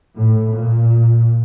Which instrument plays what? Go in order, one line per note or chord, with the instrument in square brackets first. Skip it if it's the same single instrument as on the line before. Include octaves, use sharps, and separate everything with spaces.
[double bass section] A2
A#2